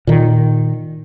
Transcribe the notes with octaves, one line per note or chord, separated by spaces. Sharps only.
A#2 D#3